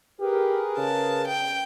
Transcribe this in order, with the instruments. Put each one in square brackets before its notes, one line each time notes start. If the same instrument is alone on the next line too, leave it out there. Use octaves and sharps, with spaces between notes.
[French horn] G4 [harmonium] G#4 A#4 B4
[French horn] C#3 [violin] A5
[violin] G5